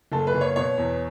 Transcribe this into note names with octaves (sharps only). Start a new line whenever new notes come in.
F#1 A4
B4
F#1
C#5
B2 C#5
E2